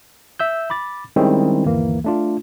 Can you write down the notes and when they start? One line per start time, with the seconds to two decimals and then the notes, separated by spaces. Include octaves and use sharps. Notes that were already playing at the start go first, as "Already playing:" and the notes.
0.39 E5 E6 G6
0.70 B5 D6 A6
1.16 D#3 G3 G#3 C4 C#4 E4
1.65 G1 D#2 E3 A#3
2.04 A3 D4 F4